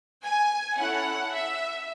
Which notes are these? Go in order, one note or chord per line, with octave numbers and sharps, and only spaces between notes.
G#5
C#4 E4 A4 F#5
E5